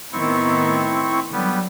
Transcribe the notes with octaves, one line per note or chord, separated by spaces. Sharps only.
A2 D#3 B3 C4 E4 C#6
D3 F#3 G3 B3